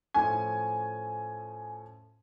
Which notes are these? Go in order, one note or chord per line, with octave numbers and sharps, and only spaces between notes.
A2 F3 A3 C#4 G#5